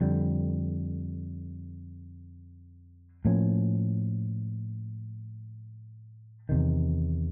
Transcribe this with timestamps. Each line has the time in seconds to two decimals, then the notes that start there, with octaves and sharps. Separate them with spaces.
0.01 F2 D3 G3
3.25 A2 F3 A#3 C#4
6.49 E2 C3 D#3